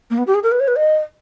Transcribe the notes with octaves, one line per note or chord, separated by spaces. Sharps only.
A#3
B3
G4
G#4
A#4
B4
C#5
B4
D#5